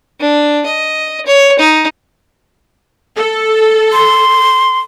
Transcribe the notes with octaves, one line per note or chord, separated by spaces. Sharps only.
D4
D#5
C#5
D#4
A4
C6